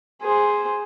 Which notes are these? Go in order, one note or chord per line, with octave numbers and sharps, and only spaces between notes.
G#4 C5